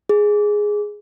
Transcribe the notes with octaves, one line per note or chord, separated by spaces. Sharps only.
G#4